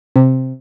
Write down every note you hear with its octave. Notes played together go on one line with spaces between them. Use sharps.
C3